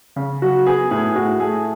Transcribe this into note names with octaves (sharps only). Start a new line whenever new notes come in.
C#3
F#3 F#4
B3 G#4
A2 G#4
A2 F#4
A3 G#4